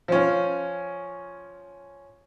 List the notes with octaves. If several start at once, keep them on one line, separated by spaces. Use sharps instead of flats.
F3 C#4